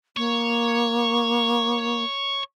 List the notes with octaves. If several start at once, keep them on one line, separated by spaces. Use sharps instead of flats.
A#3 C#5